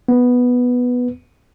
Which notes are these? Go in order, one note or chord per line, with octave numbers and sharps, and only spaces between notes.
B3